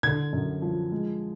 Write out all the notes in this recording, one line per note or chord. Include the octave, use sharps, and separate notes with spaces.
D3 G#6
F#2
F3
G#3